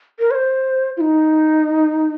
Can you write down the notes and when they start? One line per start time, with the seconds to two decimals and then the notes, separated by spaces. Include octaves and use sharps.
0.19 A#4
0.31 C#5
0.35 C5
0.97 F4
1.01 D#4